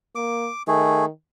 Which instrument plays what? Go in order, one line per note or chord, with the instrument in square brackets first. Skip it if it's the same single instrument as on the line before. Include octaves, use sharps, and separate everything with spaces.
[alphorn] A#3 [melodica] D6
[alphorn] D#3 [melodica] A3 G#4